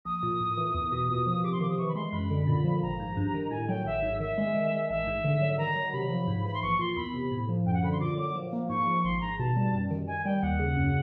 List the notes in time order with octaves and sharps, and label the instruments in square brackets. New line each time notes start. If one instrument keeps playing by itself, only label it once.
[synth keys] A#1 [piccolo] D#6
[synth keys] A#2
A2
E3
E2
B2
A#2
F3
[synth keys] C3 [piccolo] D6
[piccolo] C6
[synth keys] D#3 [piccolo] D6
[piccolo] D#6
[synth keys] E3 [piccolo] C#6
[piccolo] B5
[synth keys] G#3 [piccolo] C6
[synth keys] F#2 [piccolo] B5
[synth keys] D3
A#2
F3
[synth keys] G#1 [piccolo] A#5
[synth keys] G#2
G2
D#3
[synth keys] A2 [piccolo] G#5
[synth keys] F#3 [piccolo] G5
[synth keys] G#1 [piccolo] E5
[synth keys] G#2
[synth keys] D#3 [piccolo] E5
[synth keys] G#3
D#3
G#3
[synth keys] A1 [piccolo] E5
[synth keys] G#2
D3
F#3
[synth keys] D#3 [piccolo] A#5
[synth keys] F#3
[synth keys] C3 [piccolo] B5
[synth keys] F3
G#2
[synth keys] E3 [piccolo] B5
[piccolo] C6
[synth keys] A#1 [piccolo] C#6
[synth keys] A#2 [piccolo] C6
[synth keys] E2 [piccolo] B5
[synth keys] C3
A2
F3
[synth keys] F#2 [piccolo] G5
[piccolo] F#5
[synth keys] D3 [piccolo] B5
[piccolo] C6
[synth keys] A#2 [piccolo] D6
[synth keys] F#3 [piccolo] D6
[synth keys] F3
A#3
[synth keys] G#2 [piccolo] C#6
[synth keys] F3
[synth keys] G#1 [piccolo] C6
[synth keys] G#2 [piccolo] A#5
[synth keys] B2 [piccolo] A5
[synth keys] G3
F#2
D#3
[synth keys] D#3 [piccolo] G#5
[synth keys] G3 [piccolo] G5
[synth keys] D#2 [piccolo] F#5
[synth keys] C#3
F#2